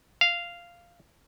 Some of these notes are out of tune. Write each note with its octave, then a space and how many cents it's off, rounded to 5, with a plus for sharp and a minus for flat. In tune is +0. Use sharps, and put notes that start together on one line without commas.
F5 -10